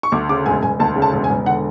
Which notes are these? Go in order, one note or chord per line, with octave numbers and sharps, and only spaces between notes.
C#6
D2 D6
C#3 D6
E1 G#5
E1 G#5
D2 A5
C#3
A5
E1
G#5
E1
D3 F#5